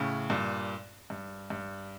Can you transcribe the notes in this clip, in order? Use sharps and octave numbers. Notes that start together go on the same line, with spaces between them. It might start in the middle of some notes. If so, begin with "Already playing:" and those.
Already playing: A2 C#3
G2 A#2
G2
G2